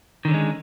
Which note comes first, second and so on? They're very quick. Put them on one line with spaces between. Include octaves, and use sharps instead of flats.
D#3 D3 C#4 G#3